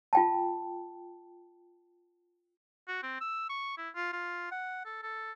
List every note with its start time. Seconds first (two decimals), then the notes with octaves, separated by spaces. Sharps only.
0.13 F4 G5 A5
2.88 F#4
3.03 C4
3.21 E6
3.49 C#6
3.78 E4
3.96 F4
4.13 F4
4.51 F#5
4.86 A4
5.03 A4